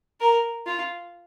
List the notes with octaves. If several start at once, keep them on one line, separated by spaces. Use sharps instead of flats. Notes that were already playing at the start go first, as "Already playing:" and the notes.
A#4
F4